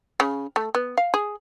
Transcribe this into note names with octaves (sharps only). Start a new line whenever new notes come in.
C#3
A3
B3
F5
G#4